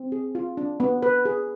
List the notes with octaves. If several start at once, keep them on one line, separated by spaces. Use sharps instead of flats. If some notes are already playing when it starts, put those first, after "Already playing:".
Already playing: C4
G#4
F4
D4
B3
B4
G#4